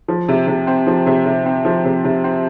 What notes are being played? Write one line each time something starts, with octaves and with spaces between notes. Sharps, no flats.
F3
C3
C3
C4
F3
C3
C3
C4
F3
C3
C3
C4